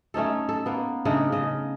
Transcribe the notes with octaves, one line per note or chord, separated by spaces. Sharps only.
A3 C#4 D#4 A4
A4
A#3 B3
C#3 A3 D4 D#4
C#3 D#5